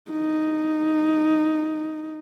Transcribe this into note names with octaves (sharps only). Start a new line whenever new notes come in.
D#4